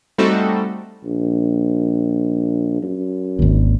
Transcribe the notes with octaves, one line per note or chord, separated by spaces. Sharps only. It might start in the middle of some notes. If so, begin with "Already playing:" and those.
G3 A3 C4 D#4 F#4 A4
A#1
F#2
G#1 D#2